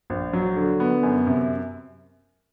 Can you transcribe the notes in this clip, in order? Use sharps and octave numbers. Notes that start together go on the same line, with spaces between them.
A#1
F#3
D3
B3
F#2
C3